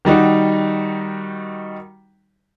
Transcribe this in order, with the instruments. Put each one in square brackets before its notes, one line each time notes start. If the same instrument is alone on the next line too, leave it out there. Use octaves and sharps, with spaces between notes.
[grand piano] D#3 G3 D#4 F#4